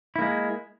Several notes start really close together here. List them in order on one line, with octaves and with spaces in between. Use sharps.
E4 A#3 G#3